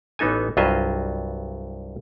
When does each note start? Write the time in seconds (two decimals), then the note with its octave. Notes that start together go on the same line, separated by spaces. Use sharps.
0.19 A1 E3 B3 D#4 A4 G#5
0.57 C2 G2 F#3 F4 D#5 E5